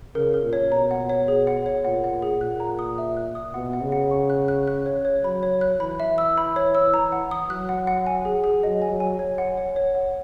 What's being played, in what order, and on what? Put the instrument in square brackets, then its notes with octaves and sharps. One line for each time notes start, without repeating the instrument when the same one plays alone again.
[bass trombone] C#3 [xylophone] A#4
[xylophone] A#4
[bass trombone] A#2
[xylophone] C#5
[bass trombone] B2 [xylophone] A#5
[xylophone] F#5
C#5
G#4
F#5
C#5
[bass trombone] A#2 [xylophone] F#5
[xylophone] F#5
G#4
[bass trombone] A#2 [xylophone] F#6
[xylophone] A#5
D#6
E5
F#6
D#6
[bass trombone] B2 [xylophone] F#5
[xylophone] F#5
[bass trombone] C#3
[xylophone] F#5
C#6
F#6
F#6
F#6
C#5
C#5
[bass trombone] F#3 [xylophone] B5
[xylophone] C#5
F#6
[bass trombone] E3 [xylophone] B5
[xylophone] E5
E6
B5
C#5
E6
A#5
F#5
D#6
[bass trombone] F#3 [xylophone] F#6
[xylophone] F#5
F#5
G#5
G#4
G#4
[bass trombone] F#3 [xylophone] D#5
[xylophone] G#5
[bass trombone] F#3
[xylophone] G#5
C#5
F#5
C#5
C#5
F#5